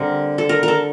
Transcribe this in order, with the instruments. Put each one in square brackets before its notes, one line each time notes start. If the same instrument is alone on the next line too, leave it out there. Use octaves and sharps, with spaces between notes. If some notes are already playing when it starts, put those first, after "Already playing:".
Already playing: [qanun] D3 G3 C4 A#4
A4
A#4
A#4
A4